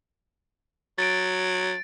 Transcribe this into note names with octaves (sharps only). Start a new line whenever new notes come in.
F#3 A6 D7